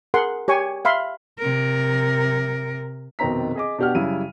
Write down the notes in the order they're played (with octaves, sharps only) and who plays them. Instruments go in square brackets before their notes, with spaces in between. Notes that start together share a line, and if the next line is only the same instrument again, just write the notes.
[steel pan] G#4 A#4 F#5 C6
G4 C#5 G#5 C#6
E5 F5 B5 C6
[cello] C3 A#4
[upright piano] F1 B2 D#3 C4 A#5 B6
G#4 D#5 D6
B2 D4 G4 F#5 F6
F#2 C#3 G3 E4 D#7